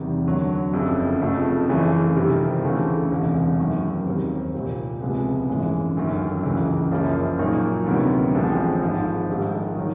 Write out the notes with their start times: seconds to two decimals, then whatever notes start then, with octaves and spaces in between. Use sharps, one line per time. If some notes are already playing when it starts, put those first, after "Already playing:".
Already playing: E2 C3 D#3 G3
0.26 D2 D3 F#3
0.73 F#1 F2 C#3
1.21 F1 F2 C#3 F3 A3
1.68 F#2 C#3 E3 A3
2.16 F2 C3 D#3 G3 C4
2.63 D2 C#3 E3 A3
3.11 E1 E2 C3
3.59 F#2 D#3 F#3 A#3
4.06 D#2 D#3 G3 C4
4.54 C2 A#2 G3
5.01 C#2 C3 F3 G#3 B3
5.49 G#1 F#2 C#3 E3 G#3
5.96 G1 F#2 D#3 F#3 A#3
6.43 C#2 C#3 E3
6.92 F#1 F#2 C#3 F3 A#3
7.39 A#2 F#3 A#3 D#4
7.86 D2 C3 D#3 F#3 B3
8.35 A1 A2 F3 G#3 C4
8.82 G#1 G#2 F3
9.29 A#1 G#2 D#3 G3
9.77 D#3 F#3